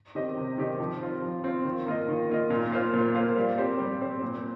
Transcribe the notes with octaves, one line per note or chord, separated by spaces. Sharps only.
D#3 C4 G4 D#5
C3
D#3 C4 G4 D#5
F3
C4 F4
F3
C4 F4
D#3
A#3 F4 D#5
D#3
A#3 F4 D#5
A#2
A#3 F4 C5 F5
A#2
A#3 F4 C5 F5
G3
C4 G4 C5
G3
C4 G4 C5
A#2